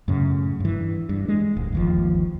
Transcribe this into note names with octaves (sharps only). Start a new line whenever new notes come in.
F#2 A2 C#3
G2 E3
G2
G#3
D1
G1 D#2 F3